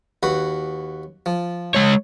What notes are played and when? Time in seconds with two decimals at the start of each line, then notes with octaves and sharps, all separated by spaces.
0.23 D#2 F#4 B4
1.26 F3
1.75 G#3 C#5